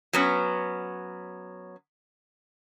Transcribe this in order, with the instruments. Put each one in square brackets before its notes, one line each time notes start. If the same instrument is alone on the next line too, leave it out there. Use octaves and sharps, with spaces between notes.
[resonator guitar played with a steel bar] F#3 B3 C#4